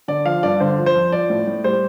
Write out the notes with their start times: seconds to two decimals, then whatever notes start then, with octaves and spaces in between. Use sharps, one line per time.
0.08 D3 D5
0.25 F3 F5
0.43 G2 D5
0.60 D3 C5
0.78 F3
0.86 C5
0.95 F2
1.12 F3 D5
1.30 A2
1.47 A2
1.64 G3 C5